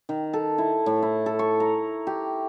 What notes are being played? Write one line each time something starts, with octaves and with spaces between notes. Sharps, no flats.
D#3
A4
E4
A2
E4
A4
C#6
A#5
G4